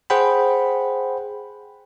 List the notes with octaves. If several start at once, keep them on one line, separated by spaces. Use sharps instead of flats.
G#4 C5 F#5 G5 B5